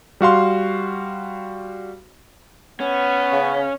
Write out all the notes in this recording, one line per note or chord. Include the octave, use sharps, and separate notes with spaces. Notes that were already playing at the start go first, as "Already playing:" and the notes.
G3 F#4 F5 C6
B3 C#4
C#3